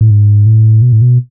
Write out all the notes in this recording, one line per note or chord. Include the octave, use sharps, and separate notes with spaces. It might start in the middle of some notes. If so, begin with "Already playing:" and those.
A2
G#2
A2
B2
A2
B2